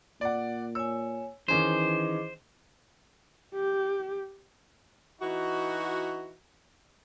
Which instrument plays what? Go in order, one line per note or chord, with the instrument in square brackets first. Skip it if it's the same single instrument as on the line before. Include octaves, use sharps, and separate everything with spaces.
[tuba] A#2 [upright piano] D5 F#5
[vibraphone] C#5 G#5 [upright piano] E6
[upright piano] D#3 C#4 D#4 [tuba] E3 [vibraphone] G#4 D#5 D6 [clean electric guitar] C5
[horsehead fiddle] G4
[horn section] E3 D#4 F#4